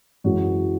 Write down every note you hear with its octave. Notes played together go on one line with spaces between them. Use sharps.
F#2 E3 G#3 F#4